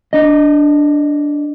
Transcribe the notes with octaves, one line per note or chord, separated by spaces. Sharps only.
D4 D#5